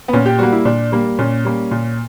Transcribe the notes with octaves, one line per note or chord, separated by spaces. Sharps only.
B3
A#2 C#4
G4
G3 A#3 F#4
E4
A#2 D4
G3 A#3
A#2 C#4
G3 A#3
A#2